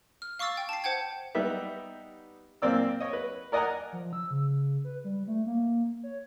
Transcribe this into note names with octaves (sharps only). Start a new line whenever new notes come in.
F6
F5 C#6 D6 E6 A6 C7
G5
A5 C7
C5 F#5 G5 G#6
G3 B3 D#4 G4 B4 E5
A#2 A#3 C4 D5 E6
C#5 D#5
B4
A#4 D5 D#5 F#5 G#5 A#5
F3
E6
C#3
B4
G3
A3
A#3
C#5